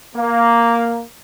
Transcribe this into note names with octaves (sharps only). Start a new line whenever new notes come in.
A#3